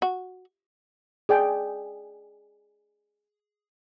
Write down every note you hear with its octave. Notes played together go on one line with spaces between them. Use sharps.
F#4
G#4 D5 G5